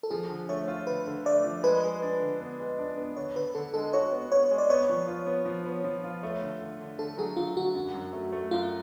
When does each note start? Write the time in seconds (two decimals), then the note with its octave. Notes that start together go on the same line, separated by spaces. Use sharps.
0.03 A4
0.10 F3 G#4
0.29 D3
0.49 A3 C#5
0.68 F4
0.87 D3 B4
1.07 D3
1.26 A3 D5
1.44 F3
1.63 G#3 B4
1.84 G#3
2.02 D4
2.21 D3
2.40 B3
2.60 G#3
2.79 D4
2.97 B3
3.17 D3 C#5
3.36 D3 B4
3.55 D3 A4
3.74 G#3 A4
3.93 F#4 C#5
4.12 B3
4.31 B3 C#5
4.51 G#3
4.58 D5
4.70 B3 C#5
4.89 F3
5.07 F4
5.26 B3
5.45 F3
5.66 B3
5.84 F3
6.04 F4
6.23 A3
6.42 D3
6.60 D3
6.80 D3
6.98 D3 A4
7.17 F#3 G#4
7.37 D3 F4
7.56 D3 F#4
7.75 F#2
7.94 F#2
8.13 A3
8.32 A3
8.51 F#2 F4